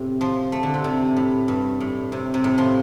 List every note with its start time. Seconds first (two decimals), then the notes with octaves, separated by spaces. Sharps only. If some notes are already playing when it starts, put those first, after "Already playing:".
Already playing: A2 C3
0.21 F3
0.52 A3
0.63 D3
0.74 C3
0.84 C3
1.17 A2
1.48 G2
1.80 A2
2.12 C3
2.34 C3
2.44 A2
2.58 F3